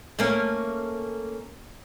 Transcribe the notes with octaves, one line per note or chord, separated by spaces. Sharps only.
A3 A#3 C#4